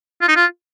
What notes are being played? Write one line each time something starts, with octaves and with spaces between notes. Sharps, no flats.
F4
D#4
F4